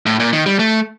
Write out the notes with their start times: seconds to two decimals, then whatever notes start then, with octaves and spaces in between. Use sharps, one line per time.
0.06 A2
0.20 A#2
0.33 D#3
0.46 G3
0.59 A3